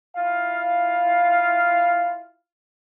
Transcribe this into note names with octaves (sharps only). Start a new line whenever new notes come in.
E4 F4 F5